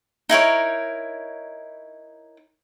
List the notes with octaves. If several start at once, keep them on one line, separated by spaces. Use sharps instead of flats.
D#4 E4 A#4 C#5